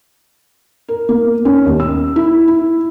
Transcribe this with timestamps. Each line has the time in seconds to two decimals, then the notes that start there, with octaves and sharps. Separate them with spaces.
0.88 A#4
1.09 A#3
1.45 C#4
1.66 D#2
1.80 E6
2.16 E4
2.48 E4